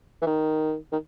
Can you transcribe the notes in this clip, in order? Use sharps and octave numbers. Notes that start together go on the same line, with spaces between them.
E3
D#3
D#3